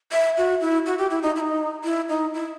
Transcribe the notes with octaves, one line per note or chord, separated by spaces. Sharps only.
E5
F#4
E4
F#4
G4
E4
D#4
E4
D#4
E4
D#4
E4